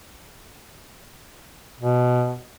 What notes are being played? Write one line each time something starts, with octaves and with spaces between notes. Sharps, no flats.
B2